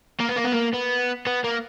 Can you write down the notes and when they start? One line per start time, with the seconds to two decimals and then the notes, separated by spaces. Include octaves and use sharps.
0.20 A#3
0.28 B3
0.36 A#3
0.44 B3
0.52 A#3
0.73 B3
1.27 B3
1.44 A#3